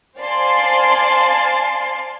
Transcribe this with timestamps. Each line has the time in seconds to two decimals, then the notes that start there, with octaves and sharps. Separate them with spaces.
0.18 C5 D5 F5 G#5 A5 C6